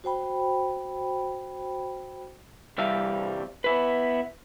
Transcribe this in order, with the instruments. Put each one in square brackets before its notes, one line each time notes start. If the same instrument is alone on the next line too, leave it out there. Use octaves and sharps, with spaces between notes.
[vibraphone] F#4 C5 G5 B5
[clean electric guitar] C2 E3 G3 E5 F5
B3 E4 B4